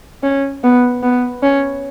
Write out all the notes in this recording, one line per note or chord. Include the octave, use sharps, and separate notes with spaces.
C#4
B3
B3
C#4